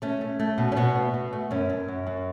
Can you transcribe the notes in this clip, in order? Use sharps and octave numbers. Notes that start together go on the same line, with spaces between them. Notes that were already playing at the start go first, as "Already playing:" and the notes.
A3 C#4
A3
A3
B2
C#4
B2 B3
A3
B2
A3
F#2 C#4
F#2
F#2
F#2